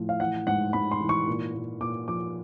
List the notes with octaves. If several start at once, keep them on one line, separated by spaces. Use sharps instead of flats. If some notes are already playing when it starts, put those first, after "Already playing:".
Already playing: A2 F3
F5
E3 F#5
G#2 F#5
G#2 B5
C6
E3
C#6
A#2
A#2
A#2 D6
F3 D6